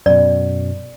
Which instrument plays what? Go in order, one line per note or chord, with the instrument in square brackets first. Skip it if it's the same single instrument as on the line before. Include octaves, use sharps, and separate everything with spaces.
[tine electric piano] F#2 B2 [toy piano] D5